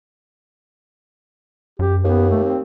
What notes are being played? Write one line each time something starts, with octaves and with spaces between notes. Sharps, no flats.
F#2 G4
D#2 B3
A3
C4